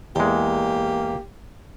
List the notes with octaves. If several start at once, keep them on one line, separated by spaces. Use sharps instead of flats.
E2 G#3 A#3 G4